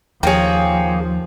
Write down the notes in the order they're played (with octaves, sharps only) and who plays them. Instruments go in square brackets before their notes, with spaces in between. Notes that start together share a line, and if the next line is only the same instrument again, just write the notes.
[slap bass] D#2 [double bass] F3 [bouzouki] A#3 G#4 [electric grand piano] C#5 G5